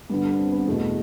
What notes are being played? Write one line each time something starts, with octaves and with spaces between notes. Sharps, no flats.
G2 D3 B3
D4
B3
C4
B3
E2 B2 A3